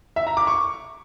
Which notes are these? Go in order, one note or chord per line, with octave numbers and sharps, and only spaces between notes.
E5
A#5
D6
C#6